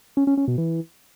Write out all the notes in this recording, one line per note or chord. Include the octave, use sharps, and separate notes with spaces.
C#4
C#4
C#4
B2
E3